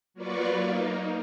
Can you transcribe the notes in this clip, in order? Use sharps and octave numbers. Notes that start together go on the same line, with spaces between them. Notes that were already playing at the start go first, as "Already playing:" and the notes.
F#3 A#3 F4 B4 D5 C#6
A#3 D#4